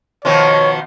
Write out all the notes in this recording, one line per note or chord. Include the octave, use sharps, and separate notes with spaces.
B2 D#3 F3 C#5